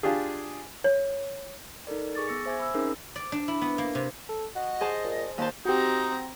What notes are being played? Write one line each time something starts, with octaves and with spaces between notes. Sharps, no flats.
D4 F4 G4 G#4
C#5
D#4 A4 A#4 D5
G#4 C#6 D6 A6
B3 E6 A#6 C#7
C5 E5 G#5 D6 G#6
B5 E6
C4 C#4 D#4 G#4 A#4
D5
D4
E4
B3
A#3
C3
A4
F#4 D#5
G#4 C5 A5
A#2
D#2 A#2 C5 A5
C4 D#4 F#4 G4 A#5